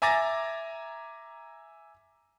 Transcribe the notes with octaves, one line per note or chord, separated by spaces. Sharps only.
E5 G#5 A#5 D6 A6 A#6